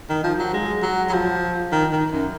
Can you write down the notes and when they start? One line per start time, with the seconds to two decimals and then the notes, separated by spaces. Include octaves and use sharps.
0.09 D#3
0.24 F3
0.39 F#3
0.53 G#3
0.82 F#3
1.09 F#3
1.13 F3
1.72 D#3
1.92 D#3
2.11 F#2